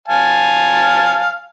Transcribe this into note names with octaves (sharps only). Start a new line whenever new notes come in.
F5 G#5 A5